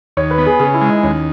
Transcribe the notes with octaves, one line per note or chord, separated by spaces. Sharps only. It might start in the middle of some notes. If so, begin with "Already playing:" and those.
D#2 C#5
B4
B3
G#4
C#3 G#4
E4
G#3
D#4
D#2 C#4